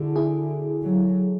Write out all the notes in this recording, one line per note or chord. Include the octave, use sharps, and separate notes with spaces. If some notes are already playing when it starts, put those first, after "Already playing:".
Already playing: D3 E4 F#4 G#4 A4
E4 G#4
F#3